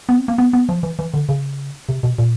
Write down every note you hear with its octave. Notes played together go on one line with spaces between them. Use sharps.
B3
C4
A#3
B3
B3
F3
E3
E3
D3
C#3
C3
B2
A#2